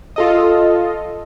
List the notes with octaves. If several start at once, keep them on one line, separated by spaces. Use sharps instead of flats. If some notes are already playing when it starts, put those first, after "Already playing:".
F4 A4 D#5